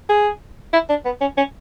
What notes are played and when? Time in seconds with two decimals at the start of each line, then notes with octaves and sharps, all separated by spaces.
0.09 G#4
0.73 E4
0.89 D4
1.05 B3
1.21 C#4
1.37 C#4